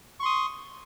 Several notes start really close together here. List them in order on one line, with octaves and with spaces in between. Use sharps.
C#6 C6 D#6